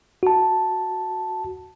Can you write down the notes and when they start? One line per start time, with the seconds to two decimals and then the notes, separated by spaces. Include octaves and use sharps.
0.23 F#4 A5